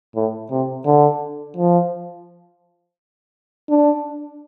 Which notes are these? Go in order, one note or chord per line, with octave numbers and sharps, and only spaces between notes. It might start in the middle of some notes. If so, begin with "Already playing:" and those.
A2
C3
D3
F3
D4